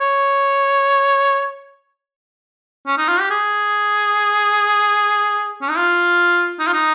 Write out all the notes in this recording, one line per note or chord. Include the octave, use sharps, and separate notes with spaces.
C#5
C#4
D#4
F4
G4
G#4
C#4
D#4
F4
D#4
F4
D#4